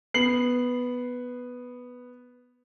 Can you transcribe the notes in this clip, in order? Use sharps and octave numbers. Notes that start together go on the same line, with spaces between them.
B3 C7 F#7